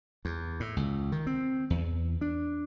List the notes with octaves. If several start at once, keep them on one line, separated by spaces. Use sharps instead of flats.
E2
A2
C#2
D#3
C4
E2
D4